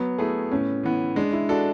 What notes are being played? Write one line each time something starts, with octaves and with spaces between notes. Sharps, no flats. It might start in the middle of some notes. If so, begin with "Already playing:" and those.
Already playing: F#3 B3
A3 E4 G#4
A2 C#4
E3 B3
G#3 D4
E4
D4 F#4 A4